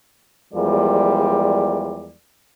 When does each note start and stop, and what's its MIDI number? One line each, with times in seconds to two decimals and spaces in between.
0.53 2.12 40
0.53 2.12 53
0.53 2.12 55
0.53 2.12 56
0.53 2.12 70
0.53 2.12 74